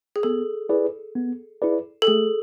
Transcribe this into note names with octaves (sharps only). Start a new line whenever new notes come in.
G#4
B3 A4
E4 G#4 B4 D5
B3
E4 G#4 B4 D5
A4
A3 G#4